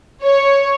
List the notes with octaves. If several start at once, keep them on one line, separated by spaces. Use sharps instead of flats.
C#5